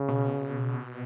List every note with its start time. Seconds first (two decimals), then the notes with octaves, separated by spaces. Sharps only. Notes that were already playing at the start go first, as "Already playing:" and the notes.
Already playing: C#3
0.09 B2